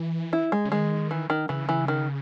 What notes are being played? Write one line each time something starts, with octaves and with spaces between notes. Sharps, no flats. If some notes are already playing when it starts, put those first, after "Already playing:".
Already playing: E3
E4
G#3
C#3
D#3 G#3
E3
D#3
C#3 E3
E3
D#3